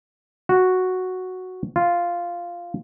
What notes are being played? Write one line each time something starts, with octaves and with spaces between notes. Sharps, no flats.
F#4
F4